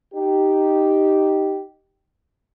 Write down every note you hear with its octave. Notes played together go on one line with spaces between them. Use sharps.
D#4 G4